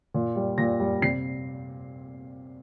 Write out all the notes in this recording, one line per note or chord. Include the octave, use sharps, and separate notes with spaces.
A#2
G3
A#2 A#6
G3
C3 C7